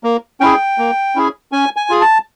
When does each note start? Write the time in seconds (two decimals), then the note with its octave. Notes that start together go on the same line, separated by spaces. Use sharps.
0.04 A#3
0.41 C#4 E4 G#4 G5
0.78 A#3
1.15 C#4 E4 G#4
1.52 C#4 G#5
1.76 G#5
1.90 F4 G#4
2.01 A5